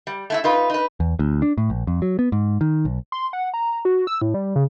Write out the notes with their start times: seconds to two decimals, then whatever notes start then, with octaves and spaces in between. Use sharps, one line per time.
0.07 G3
0.30 A3 E4 E5
0.44 D#4 F4 B4
0.70 D#4 B4
1.00 E2
1.19 D2
1.42 D4
1.58 A2
1.70 A#1
1.87 F2
2.02 F#3
2.19 B3
2.32 G#2
2.61 D#3
2.85 B1
3.12 C6
3.33 F#5
3.54 A#5
3.85 F#4
4.07 E6
4.21 A2
4.34 G3
4.56 C#3